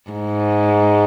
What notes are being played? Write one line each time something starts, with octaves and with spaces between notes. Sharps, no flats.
G#2